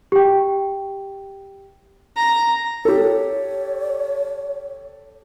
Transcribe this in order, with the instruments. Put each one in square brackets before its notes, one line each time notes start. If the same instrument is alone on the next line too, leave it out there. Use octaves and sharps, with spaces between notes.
[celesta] G4 G5
[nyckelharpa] A#5
[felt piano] G4 A4 [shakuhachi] C#5